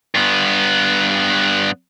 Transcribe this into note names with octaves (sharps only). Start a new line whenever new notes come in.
G2 B3